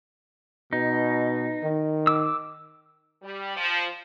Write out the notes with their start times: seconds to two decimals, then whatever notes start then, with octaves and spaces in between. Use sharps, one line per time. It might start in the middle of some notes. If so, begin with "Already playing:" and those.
0.73 B2 D#4
1.64 D#3
2.07 D6 E6
3.22 G3
3.56 F3